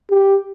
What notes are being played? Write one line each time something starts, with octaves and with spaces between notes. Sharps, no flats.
G4